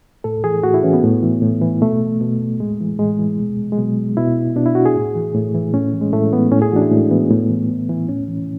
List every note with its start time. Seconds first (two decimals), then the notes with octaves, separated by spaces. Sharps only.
0.24 A2 A4
0.44 E3 G#4
0.63 A2 F#4
0.74 E4
0.83 E3 C#4
0.93 B3
1.03 A2
1.22 E3
1.42 A2
1.61 E3
1.81 B2 A3
2.21 B2
2.60 A2 G#3
2.80 E3
2.99 A2 G#3
3.19 E3
3.39 B2
3.72 G#3
3.78 B2 F#3
4.17 B2 E4
4.56 B2 D4
4.66 E4
4.75 F#4
4.86 G#4
4.96 A2
5.15 E3
5.35 A2
5.54 E3
5.73 A2 C#4
5.93 E3
6.01 G#3
6.13 A2 A3
6.32 E3 B3
6.52 A2 C#4
6.62 G#4
6.72 E3 D4 F#4
6.81 E4
6.92 A2 G#3
7.11 E3 B3
7.31 A2
7.49 E3
7.69 A2
7.89 E3
8.09 A2 C#4
8.28 E3